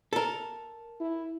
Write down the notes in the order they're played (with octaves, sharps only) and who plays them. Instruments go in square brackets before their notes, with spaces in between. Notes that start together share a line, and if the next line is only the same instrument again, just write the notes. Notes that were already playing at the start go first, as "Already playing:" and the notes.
[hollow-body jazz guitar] A4 A#4
[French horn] E4